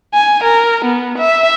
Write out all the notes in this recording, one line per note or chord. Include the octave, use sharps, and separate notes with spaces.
G#5
A#4
B3
E5